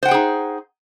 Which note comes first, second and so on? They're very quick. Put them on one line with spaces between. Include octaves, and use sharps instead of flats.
C5 F#5 G5 G#4 D#4